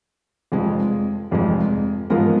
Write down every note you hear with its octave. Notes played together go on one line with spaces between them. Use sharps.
F1 F2 F3 G#3
F1 F2 F3 G#3
G#2 F3 G#3 B3 F4 A#4